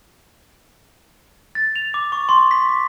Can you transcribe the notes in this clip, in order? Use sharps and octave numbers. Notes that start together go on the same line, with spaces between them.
A6
F7
D6
C#6
C6
B6
D6